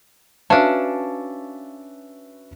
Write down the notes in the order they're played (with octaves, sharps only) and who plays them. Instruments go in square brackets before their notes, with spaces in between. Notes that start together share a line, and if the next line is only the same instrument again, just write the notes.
[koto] C#4 D4 [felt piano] F#4 B4 E5 [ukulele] F5 A5